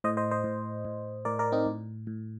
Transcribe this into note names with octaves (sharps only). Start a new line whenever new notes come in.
A2 C5 D#5
C5 D#5
C5 D#5
A2
A2
A2 A#4 D5
A#4 D5
C4 D#4
A2
A2